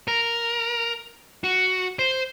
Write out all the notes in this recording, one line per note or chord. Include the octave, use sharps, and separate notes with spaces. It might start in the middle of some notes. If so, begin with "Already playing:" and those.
A#4
F#4
C5